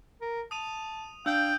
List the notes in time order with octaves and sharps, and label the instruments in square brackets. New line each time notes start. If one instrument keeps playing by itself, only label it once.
[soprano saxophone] A#4
[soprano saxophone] A5 [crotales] D#6 D#7 F7
[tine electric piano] D4 [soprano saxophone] F5 [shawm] G5 [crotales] E6 G6